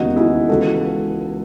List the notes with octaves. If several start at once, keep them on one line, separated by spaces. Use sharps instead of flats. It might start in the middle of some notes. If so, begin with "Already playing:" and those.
Already playing: E1 D#2 C#3 D#4 F#4
E4 G#4
C#2 C#3 E3 F#4 A4